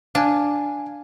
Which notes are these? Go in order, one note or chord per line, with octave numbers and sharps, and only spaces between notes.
D4 F5 G#5